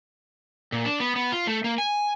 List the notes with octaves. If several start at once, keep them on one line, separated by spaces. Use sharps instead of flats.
A#2
D4
B3
B3
F4
A3
A#3
G#5